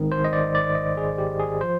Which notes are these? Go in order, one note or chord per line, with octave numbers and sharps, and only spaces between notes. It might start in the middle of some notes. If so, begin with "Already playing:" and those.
Already playing: G#1 G#2 D#3
C5
D#5
D5
D5
D#5
G#4
G4
G#4
F3 C5